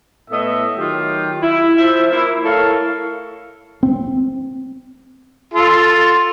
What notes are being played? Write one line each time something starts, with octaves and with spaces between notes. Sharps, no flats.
A2 A3 B3 D#5 E5
D#3 F#3 F4 G4
E4
F3 E5
A#3 E4
A3 E4 A4 A#4 C#5 F5
C4
F4 A4